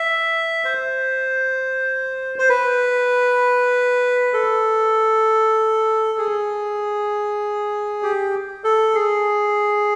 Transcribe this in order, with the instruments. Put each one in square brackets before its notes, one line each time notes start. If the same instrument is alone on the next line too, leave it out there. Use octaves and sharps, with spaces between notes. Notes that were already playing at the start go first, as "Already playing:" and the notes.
Already playing: [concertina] E5
C5
C5
B4
A4
G#4
G4
A4
G#4